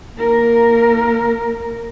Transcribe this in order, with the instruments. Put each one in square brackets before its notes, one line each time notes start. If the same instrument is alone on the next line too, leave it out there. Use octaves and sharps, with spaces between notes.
[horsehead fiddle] A#3 A#4